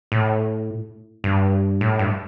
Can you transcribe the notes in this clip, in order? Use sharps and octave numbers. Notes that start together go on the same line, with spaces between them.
A2
G2
A2
G2